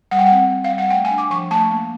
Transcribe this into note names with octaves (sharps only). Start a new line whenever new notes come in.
G3 F#5
G5
C4 F#5
C4
F5
G3
F#5
A3 G5
G#5
D4
D6
F3 C#6
A3 A5
A#3